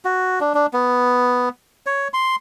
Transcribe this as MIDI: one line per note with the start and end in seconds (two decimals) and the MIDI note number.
0.05 0.39 66
0.41 0.53 62
0.55 0.66 62
0.73 1.49 59
1.86 2.08 73
2.14 2.36 84